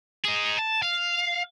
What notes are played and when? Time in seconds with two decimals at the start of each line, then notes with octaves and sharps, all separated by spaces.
0.24 D#4 G#4
0.58 A5
0.82 F5